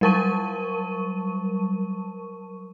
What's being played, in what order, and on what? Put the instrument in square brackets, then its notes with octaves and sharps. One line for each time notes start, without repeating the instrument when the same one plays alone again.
[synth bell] F#3 G3 A#4 A5 C#6 D#7